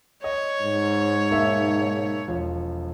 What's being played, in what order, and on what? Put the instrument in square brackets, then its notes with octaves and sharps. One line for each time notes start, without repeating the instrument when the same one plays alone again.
[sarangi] C#5 [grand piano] D#5
[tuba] G#2
[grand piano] B1 A#3 E5
E1 F3